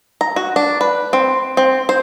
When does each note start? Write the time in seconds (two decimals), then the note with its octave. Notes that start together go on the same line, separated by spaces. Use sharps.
0.21 A#5
0.36 F#4
0.56 D4
0.81 B4
1.13 C4
1.57 C4
1.89 C5